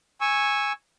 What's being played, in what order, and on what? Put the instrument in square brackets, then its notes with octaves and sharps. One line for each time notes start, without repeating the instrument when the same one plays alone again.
[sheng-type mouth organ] G#5 C#6 E6